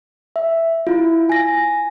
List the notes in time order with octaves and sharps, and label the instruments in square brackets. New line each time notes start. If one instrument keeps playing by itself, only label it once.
[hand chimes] E5
E4 F4
G#5 A#6